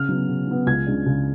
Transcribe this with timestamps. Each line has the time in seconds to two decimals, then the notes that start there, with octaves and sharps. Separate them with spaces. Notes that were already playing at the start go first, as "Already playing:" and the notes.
Already playing: C#3 F6
0.09 F#3 B3
0.29 C#3
0.47 F#3 B3
0.66 C#2 G#6
0.87 C#3 G#3 D4
1.06 C#2